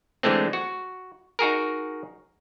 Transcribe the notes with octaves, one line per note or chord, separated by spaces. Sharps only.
D3 E3 G#3 A3 C4
F#4
D#4 F#4 G#4 A#4